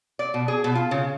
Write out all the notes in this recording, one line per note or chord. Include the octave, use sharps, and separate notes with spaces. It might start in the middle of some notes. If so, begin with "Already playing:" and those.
D5
B2
G#4
B2
F4
C#3